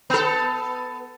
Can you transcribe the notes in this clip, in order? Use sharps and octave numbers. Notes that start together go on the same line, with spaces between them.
B3 A4